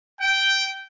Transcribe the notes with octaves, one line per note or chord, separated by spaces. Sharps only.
G5